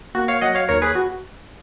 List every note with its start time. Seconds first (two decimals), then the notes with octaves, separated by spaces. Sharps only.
0.15 A#3 F#4
0.28 C#5 F5
0.41 F#3 D#5 F#5
0.55 C#5 F5
0.68 D#2 A#4 C#5
0.82 G#4 B4
0.95 F#4